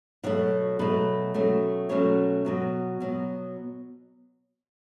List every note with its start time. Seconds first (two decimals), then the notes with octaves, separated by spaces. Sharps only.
0.23 B2 F#3 A3 F#4
0.79 B2 F#3 A3 B4
1.34 B2 F#3 A3 C#4
1.89 B2 F#3 A3 C#4 C#5
2.45 B2 F#3 B3
3.00 B2 F#3 B3